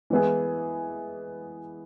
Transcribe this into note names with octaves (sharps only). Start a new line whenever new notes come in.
E3 G#3 B3 E4 G#4